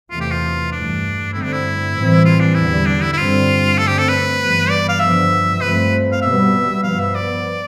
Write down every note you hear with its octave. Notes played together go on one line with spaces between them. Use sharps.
E2 C3 E3 A3 F4
G4
F4
G2 E3 A3 D4
G2 D3 A3 C4 E4
D4
E4
A2 E3 G3 C4
F4
D4
E2 D3 G3 E4
D4
E4
E4
G2 D3 G3 C4 F4
G2 D3 A3 C4 A4
G4
A4
B4
G2 E3 G3 B3
D5
F5
G2 D3 F3 B3 E5
G2 F3 A3 C4 B4
F5
B2 G3 B3 E5
G2 F3 B3 F5
E5
D5